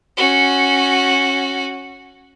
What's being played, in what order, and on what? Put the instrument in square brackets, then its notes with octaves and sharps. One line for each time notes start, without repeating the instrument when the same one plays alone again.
[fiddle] C#4 F#4